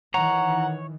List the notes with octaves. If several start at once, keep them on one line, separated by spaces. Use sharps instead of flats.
D#3 E3 C#5 F#5 A#5